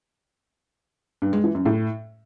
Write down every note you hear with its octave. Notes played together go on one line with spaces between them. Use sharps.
G2
G#3
E3
F#2
A2